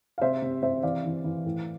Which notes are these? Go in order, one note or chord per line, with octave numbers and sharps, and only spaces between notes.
F5
C3 C5 E5
C3
C3 C5 E5
E3 D5 F5
E3
E3
A2